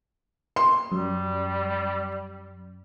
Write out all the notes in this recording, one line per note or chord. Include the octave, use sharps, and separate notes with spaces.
C6
F#2 G3